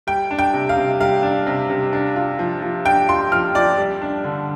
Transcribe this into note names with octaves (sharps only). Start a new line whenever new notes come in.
G3 G5
D4
G5
C3
F5
C3
G3 F5
D4
C3
C3
D4
F4
F3
F3
D4 G5
F4 C6
F3 F6
F3 D5
G3
D4
D3